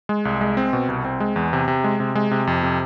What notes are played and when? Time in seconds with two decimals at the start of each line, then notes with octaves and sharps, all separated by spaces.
0.09 G#3
0.25 C2
0.41 G#3
0.57 C4
0.73 B2
0.89 C2
1.05 C4
1.20 G#3
1.36 E2
1.53 C3
1.68 C3
1.84 G#3
2.00 C3
2.15 G#3
2.31 C3
2.47 F2
2.63 C3